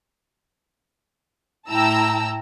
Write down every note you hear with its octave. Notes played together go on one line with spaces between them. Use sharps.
A2 E4 G5 A5 A#5 E6